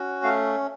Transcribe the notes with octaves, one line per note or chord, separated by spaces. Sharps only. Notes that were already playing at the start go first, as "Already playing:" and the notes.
Already playing: C#4 F#4
A3 F5